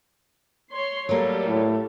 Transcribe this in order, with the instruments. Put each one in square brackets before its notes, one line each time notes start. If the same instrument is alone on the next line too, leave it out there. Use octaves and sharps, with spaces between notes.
[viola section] C#5 C6
[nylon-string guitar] F#3 A#3 [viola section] G3 A4 A#4
[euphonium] A2